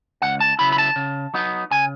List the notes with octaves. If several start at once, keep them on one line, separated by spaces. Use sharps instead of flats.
C#2 F#5
A5
C#3 F#3 B3 E4 B5
B5
A5
C#3
F#3 B3 D#4
C#3 G#5